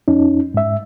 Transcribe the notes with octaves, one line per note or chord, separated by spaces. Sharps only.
F2 C#4 D#4
G#2 E5